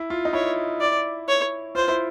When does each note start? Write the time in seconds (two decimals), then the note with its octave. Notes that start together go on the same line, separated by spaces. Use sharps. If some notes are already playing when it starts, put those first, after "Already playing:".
Already playing: E4
0.10 F4
0.25 D#4
0.33 E4 C#5
0.80 D5
1.28 C#5
1.75 F4 C5
1.88 E4